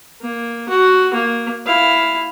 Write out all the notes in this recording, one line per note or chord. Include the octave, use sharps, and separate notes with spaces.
A#3
F#4
A#3
E4 F5